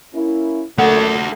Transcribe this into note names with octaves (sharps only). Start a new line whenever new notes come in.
A#3 C#4 E4
F#2 A#2 A3 A4 F#5